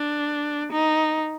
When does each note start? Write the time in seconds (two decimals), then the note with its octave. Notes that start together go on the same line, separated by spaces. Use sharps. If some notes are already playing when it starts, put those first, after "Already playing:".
Already playing: D4
0.72 D#4